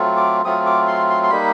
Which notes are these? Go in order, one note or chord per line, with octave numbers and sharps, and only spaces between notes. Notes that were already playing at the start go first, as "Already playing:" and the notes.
Already playing: F#3 A3 C4 F4
D6
F#3 A3 C4 F4 D#6
D6
C6
C6
C6
G3 A#3 D#4 B5